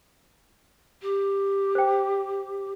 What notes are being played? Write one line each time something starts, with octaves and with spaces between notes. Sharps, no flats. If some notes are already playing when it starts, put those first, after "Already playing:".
G4
C5 G5